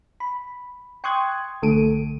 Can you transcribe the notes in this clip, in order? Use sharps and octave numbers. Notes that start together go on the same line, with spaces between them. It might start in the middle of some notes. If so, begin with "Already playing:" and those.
B5
G5 C6 C#6 D#6 F#6 G#6
B1 D3 A3 A4 D7 D#7